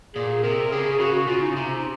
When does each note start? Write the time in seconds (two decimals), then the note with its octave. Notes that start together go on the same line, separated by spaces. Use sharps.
0.15 A#2 G#4
0.33 G#4
0.43 C3 A#4
0.71 C#3 G#4
0.92 G#4
0.99 C#3 F#4
1.17 F#4
1.27 C#3 F4
1.42 D#4
1.56 C3